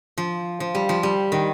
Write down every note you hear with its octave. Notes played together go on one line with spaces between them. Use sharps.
F3
F3
G3
F3
G3
D#3